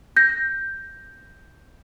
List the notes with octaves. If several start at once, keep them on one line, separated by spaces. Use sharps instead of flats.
G6 A#6